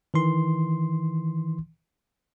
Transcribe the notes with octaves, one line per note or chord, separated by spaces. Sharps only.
D#3 E3 C6